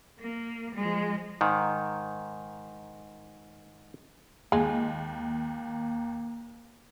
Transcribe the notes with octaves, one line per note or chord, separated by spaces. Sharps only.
A#3
F3 G#3
G#2 D#3
D#2 G#3 A#3 F4